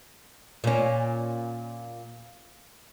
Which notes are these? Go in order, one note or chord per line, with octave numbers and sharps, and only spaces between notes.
A#2 C#4